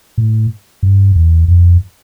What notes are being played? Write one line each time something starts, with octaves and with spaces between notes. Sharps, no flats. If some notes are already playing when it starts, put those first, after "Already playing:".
A2
G2
E2
F2